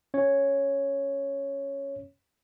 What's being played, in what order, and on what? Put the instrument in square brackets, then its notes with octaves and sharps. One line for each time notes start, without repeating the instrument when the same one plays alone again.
[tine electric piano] C#4 C#5